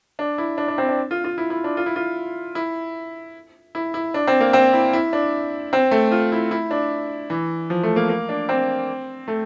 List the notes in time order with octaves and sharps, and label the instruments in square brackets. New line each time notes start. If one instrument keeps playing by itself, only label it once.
[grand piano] D4
E4
D4
D4
C4
D4
F4
F4
E4
E4
D4
F4
E4
F4
E4
E4
E4
D4
C4
A#3
C4
E4
E4
D4
C4
A3
F4
E4
E4
D4
E3
F3
A3
A#3
A#3
D4
C4
A3